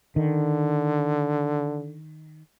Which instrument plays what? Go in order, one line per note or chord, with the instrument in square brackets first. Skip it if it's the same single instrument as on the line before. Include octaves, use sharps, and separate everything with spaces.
[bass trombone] D3 [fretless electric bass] D#3